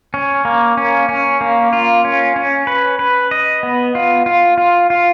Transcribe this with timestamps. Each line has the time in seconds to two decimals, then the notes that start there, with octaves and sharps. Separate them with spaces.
0.14 C#4
0.45 A#3
0.77 C#4
1.09 C#4
1.41 A#3
1.73 F4
2.05 C#4
2.36 C#4
2.67 B4
2.99 B4
3.31 D#5
3.63 B3
3.95 F4
4.26 F4
4.58 F4
4.90 F4